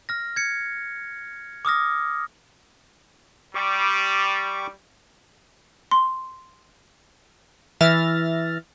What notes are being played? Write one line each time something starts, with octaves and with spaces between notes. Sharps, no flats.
F6 A#6
G#6 C#7
D6 D#6 F6 A#6
G3 C#6 D6
C6
E3 E5 F6 A6 A#6